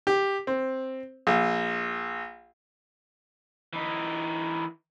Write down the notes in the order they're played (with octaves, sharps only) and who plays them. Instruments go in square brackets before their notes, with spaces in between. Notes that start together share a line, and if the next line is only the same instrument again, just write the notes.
[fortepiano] G4
C4
A#1
[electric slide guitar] E3 D#4